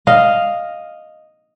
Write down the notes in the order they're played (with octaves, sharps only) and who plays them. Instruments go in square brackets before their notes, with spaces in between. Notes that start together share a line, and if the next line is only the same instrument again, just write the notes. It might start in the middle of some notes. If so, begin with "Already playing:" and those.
[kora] D#5 F5